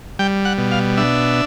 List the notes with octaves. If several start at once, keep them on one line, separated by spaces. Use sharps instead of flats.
G3 G5
F#5
B2
F5
D4 E5